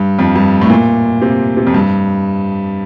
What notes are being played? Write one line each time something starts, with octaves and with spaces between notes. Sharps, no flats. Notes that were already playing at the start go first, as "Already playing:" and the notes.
Already playing: G2
F2
G2
A2
A#2
C3
C3
F2
G2